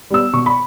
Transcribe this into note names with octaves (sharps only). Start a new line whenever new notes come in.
G3 B3 E6
B2 C#6
B5